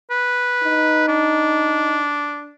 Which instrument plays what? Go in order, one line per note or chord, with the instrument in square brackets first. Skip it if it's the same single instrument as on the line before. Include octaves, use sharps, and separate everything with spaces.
[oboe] B4
[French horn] D#4
[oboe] D4